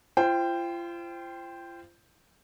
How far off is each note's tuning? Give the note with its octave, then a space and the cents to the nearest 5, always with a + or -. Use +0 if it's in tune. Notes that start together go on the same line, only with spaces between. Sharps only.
F4 -35 C5 +0 G5 +5